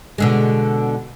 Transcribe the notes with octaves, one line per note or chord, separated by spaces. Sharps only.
B2 D3 G#3